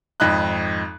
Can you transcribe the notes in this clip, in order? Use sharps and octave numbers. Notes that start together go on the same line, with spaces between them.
G#1 F2 D#4 B5 F#6